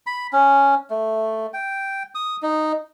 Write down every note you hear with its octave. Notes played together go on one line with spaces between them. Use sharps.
B5
C#4
A3
G5
D#6
D#4